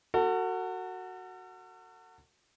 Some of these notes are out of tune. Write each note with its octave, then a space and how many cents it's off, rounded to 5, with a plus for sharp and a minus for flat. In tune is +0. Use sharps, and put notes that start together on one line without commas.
F#4 +0 A4 +40